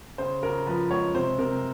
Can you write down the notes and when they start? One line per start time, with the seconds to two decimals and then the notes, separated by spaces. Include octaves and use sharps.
0.18 C#3 C5
0.43 C#3 A#4
0.66 F3 B4
0.91 G#3 C#5
1.14 C3 C5
1.38 C3 A#4